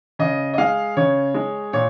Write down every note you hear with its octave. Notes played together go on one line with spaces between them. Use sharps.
C#3 D#5
D#5
G#3 F5
C#3 C#5
G#3
A#2 C#5